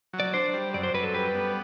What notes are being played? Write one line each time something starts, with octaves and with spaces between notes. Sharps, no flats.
F#3
D5
D4 C5
G3
F#2 D5
C5
F#2 B4
A4
G3 B4
B3